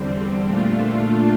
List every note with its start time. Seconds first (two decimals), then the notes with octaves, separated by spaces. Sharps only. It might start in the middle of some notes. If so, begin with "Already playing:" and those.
Already playing: E2 D3 G3 C4
0.46 A#2 A3 D4 F4